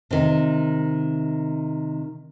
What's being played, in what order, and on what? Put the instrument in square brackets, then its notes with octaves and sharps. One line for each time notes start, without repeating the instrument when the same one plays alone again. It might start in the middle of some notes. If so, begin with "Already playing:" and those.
[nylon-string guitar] C3 D#3